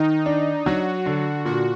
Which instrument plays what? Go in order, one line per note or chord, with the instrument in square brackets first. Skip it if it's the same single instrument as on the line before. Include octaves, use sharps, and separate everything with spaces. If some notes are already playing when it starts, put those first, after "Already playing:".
Already playing: [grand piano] D#3 [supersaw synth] D#4
[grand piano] D4
[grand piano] F#3 [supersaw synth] F#4
[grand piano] D3
[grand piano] A#2 [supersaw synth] F#4